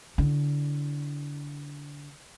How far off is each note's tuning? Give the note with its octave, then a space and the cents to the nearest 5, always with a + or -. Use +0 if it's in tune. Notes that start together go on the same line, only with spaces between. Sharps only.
D3 -25 E4 +0